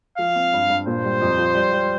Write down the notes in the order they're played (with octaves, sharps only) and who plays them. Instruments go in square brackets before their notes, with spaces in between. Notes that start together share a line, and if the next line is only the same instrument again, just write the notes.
[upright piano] F3 [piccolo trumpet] F5
[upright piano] C4
G2
G2
[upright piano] A#2 [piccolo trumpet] C5
[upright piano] G3
F2
F3
G3
G3